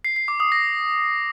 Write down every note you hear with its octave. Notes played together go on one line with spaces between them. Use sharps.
C7
C7
D6
D#6
A#6